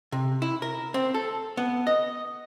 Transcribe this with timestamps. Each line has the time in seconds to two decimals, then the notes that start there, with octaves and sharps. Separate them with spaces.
0.12 C3
0.42 E4
0.62 A#4
0.94 C4
1.14 A4
1.57 B3
1.87 D#5